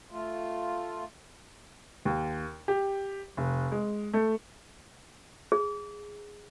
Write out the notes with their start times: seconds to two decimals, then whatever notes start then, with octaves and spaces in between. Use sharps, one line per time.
0.11 A3 F4
2.05 D#2
2.68 G4
3.37 F1
3.72 G#3
4.14 A3
5.52 G#4